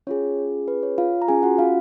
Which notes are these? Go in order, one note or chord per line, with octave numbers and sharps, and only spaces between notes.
C#4 F4 G#4 C#5
B4
C#5
F4 F5
A#5
C#4 F4 G#4 G#5
F#4 F#5
F4 F5